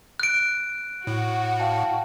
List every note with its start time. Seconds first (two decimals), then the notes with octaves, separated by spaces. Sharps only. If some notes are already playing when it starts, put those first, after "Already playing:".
0.20 F#6 D7
1.07 A2 F#4
1.60 F5 G5 A5